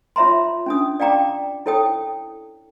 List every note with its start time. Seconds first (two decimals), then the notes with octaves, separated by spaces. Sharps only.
0.16 F4 C#5 E5 A#5 C6
0.66 C#4 D4 D#6
1.00 D5 F5 G5 A#5 D6
1.66 E4 A4 C#5 G5 D#6